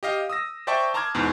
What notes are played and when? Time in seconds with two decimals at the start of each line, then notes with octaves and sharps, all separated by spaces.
0.03 G4 D#5 F5
0.30 D#6 E6 A#6
0.67 C5 D5 E5 G5 A5 C#6
0.94 A5 A#5 C6 D6 F6 G#6
1.14 E2 G#2 B2